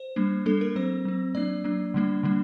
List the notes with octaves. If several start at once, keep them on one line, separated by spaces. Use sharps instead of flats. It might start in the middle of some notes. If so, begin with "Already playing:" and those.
Already playing: C5
G3 A#3 D4
G3 A#3 D4 A4
A#4
F#3 C4 C5
F#3 C4
F#3 A#3 D4 D5
F#3 A#3 D4
D3 G3 A#3 D4
D3 G3 A#3 D4